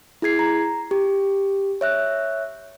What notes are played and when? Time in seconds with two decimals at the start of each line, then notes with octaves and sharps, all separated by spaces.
0.22 E4 G#4 G#6 C7
0.39 A#5
0.91 G4
1.81 C#5 E5 F#6